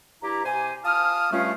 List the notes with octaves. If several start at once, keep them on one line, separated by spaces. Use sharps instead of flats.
G2 E4 G4 A#5
C3 C5 G#5
F4 A5 D#6 F6
G2 G3 A3 C#4 F4